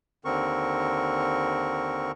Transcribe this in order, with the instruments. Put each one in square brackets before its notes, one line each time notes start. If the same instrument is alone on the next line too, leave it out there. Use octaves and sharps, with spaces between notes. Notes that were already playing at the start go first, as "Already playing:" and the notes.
[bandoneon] D#2 D3 C4 A#4 C#6